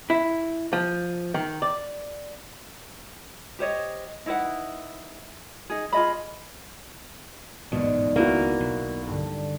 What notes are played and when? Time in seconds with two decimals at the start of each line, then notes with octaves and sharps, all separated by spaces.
0.10 E4
0.73 F3
1.34 D#3
1.62 D5
3.59 G4 C5 C#5 D#5
4.26 D#4 E4 B4 F#5
5.70 D#4 G#4
5.93 F4 G#4 D#5 B5
7.72 A1 D#2 G#2 B2 F#3 D5
8.16 C#2 D#3 A#3 B3 E4 F#4
8.60 B1
9.07 G2 D3